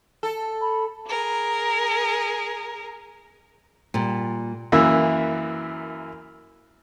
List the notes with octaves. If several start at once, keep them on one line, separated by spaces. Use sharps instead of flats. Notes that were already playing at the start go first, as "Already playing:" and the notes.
A4
B5
G#4 A#4
A#2 G3
F#2 E3 A#3 E5